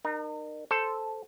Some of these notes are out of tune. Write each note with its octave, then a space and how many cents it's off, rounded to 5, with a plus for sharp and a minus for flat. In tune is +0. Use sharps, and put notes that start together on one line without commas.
D#4 -40 A#4 +0
A4 +0 C5 +0